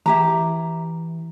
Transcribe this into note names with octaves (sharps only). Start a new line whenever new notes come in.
E3 E4 G4 A#5